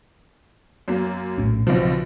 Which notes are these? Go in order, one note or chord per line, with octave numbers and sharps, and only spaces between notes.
F#2 A#3
A#1 A2 C#4
B1 C#3 F3 C4